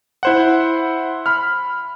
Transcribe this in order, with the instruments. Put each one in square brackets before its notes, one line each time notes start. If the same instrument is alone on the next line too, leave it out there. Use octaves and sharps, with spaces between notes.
[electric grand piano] E4 C5 F#5
B5 F6